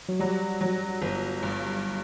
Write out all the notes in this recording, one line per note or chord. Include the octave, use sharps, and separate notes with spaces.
F#3
F#3 G3
F#3
G1
G2